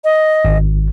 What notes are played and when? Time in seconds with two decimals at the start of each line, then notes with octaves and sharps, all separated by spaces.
0.04 D#5
0.45 G#1